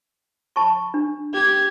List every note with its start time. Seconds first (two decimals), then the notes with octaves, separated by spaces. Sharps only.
0.56 A5 B5 C#6
0.94 D4
1.34 G4 G#6